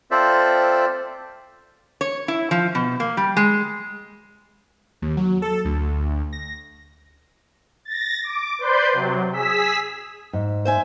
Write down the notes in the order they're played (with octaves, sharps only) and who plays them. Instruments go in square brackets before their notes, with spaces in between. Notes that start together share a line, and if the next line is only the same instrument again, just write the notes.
[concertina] C4 F4 A4 C5 D5 E5
[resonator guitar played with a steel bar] C#5
E4
F3
B2
A#3
G3
G#3
[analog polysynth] D#2
F#3
A4
D2
A#6
[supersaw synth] A6 A#6
D6
B4 C5 D5 C6 G6
C3 F#3
G#4 E6 B6
[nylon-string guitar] G#2
[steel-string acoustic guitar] C5 E5 G#5